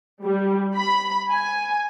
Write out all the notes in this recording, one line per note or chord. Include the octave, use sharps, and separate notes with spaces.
G3
B5
G#5